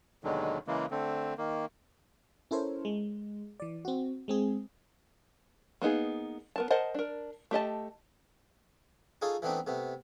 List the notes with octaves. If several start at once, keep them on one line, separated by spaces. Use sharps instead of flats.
D#2 B2 D3 D#3 F#3 G#3
C#3 E3 G#3 A#3
D3 A3 C4
D#3 A#3
C#4 E4 A4 A#4 C5 C#5
G#3
E3 D5
C4 F#4
G#3 C4 G#4
A#3 B3 D#4 G#4
B3 A#4 A5
A#4 C5 D#5 F#5 A5
D4 A#4
A3 G4 D#5 A5
D#4 F4 G#4 A4 C#5
E3 A3 B3 C4 D4 D#4
C3 A3 B3